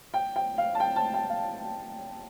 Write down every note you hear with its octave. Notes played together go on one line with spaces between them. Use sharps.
G5
G5
F5
A5
G5
A5
G5
F5